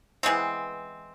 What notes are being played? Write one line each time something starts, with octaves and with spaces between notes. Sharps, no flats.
E3 G#3 B3 C4